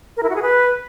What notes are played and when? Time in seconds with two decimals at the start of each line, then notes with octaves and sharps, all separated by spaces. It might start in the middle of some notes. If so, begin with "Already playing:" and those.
0.17 A#4
0.23 E4
0.29 F#4
0.36 G#4
0.42 B4